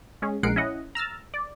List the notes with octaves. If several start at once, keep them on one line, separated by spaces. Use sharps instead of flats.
G#3 C#4 G#4
A#1 G#3 A#4 F#5 C7 D7
C#4 E4 D#5 F#5
A#5 E6 F6 A6
D5